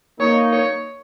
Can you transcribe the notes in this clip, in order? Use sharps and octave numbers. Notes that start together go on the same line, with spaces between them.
A#3 D#4 C#5
C#5